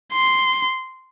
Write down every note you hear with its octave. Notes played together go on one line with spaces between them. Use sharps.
C6